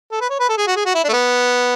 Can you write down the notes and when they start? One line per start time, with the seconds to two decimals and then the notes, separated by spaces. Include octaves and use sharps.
0.11 A4
0.21 B4
0.30 C#5
0.40 B4
0.49 A4
0.57 G#4
0.67 F#4
0.76 G#4
0.85 F#4
0.94 E4
1.04 D4
1.09 A3
1.13 B3